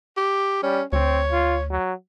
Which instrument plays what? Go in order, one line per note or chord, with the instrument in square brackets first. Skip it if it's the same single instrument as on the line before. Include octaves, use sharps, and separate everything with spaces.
[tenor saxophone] G4
[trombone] G3 [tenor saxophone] C#4
[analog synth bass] D2 [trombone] C4 [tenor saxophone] C#5
[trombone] F4
F#3